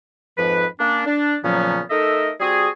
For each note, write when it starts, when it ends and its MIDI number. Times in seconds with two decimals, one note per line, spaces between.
0.37 0.65 41
0.37 0.65 44
0.37 0.65 53
0.37 0.65 71
0.80 1.05 58
0.80 1.05 61
0.80 1.05 62
1.06 1.36 62
1.44 1.81 46
1.44 1.81 49
1.44 1.81 53
1.44 1.81 54
1.44 1.81 59
1.44 1.81 61
1.90 2.30 57
1.90 2.30 63
1.90 2.30 69
1.90 2.30 70
1.90 2.30 75
1.90 2.30 76
2.40 2.68 55
2.40 2.68 60
2.40 2.68 66
2.40 2.68 68